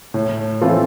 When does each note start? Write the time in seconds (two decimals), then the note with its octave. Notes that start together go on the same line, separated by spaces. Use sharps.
0.14 A2
0.61 E3 A3 C4 F4